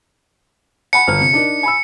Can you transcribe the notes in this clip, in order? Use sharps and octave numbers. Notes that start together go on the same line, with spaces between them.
F#5 G#5 B5 C#7
G1 F6
C3
D4 D#4 A#4
G#5 B5 E6